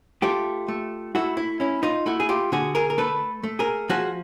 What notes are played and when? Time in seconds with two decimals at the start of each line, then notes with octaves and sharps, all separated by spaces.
0.22 A3 F4 G4
0.68 A3
1.15 A3 E4 F#4
1.37 E4
1.60 C#4 E4
1.83 D#4 F4
2.06 A3 E4 F#4
2.20 G#4
2.29 F4 G4
2.52 D3 F#4 G#4
2.75 G#4 A#4
2.90 A#4
2.98 A3 A4 B4
3.43 A3
3.59 G#4 A#4
3.89 F3 F#4 G#4